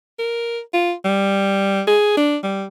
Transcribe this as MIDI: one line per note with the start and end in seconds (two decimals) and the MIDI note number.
0.19 0.60 70
0.74 0.93 65
1.05 1.82 55
1.87 2.15 68
2.17 2.37 62
2.43 2.65 55